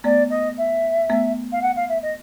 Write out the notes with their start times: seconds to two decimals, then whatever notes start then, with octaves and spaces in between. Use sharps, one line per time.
0.04 A3 B3 D5
0.30 D#5
0.58 E5
1.10 A3 B3
1.52 F5
1.62 F#5
1.76 F5
1.89 E5
2.03 D#5